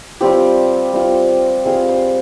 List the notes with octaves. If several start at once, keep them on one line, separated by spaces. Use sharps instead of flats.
G3 C4 F4 G4
G3 C4 F4
G3 C4 F4 G#4
C5